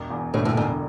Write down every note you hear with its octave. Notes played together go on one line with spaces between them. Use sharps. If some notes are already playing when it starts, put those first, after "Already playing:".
Already playing: E1
E2
A2 D3
A2
E1 A2